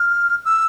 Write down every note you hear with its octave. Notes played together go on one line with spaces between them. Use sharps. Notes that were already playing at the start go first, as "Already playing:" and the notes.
Already playing: F6
E6